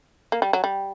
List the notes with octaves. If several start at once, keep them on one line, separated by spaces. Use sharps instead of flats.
A#3
G3
F#3
G3